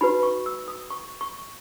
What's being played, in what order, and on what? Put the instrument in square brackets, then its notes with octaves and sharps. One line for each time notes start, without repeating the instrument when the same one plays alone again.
[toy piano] D#4 F#4 B4 B5
C#6
E6
D#6
C#6
C#6